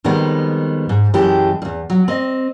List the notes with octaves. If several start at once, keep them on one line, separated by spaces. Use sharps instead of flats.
F2 D#3 G3 G#3 B3
G#2
F#2 E3 G#3 G4 A5
E2 G2
F#3
C4 D#5